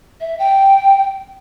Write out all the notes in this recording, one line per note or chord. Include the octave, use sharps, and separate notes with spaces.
E5
G5